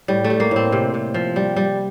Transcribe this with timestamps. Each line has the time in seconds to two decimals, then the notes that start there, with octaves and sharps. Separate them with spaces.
0.08 A2 G3
0.24 A3
0.30 G3
0.40 A#3
0.51 A2 C4
0.72 C3
0.94 C3
1.14 F3
1.36 G3
1.56 G3